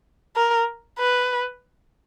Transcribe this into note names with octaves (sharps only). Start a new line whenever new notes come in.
A#4
B4